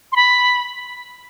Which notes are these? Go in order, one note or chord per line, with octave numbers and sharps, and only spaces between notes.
C6
B5